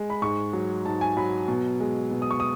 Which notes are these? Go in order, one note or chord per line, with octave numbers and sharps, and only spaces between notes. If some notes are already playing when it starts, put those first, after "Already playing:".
Already playing: G#3
B5
G#2 C#6
F#3
G#2 A5
G#5
F#3 B5
B2
G#3
B2
D#6
C#6
D#6